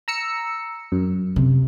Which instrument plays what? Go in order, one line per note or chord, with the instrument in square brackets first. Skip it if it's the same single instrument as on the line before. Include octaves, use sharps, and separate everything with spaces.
[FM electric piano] A#5 E6 C#7
F#2
[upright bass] C3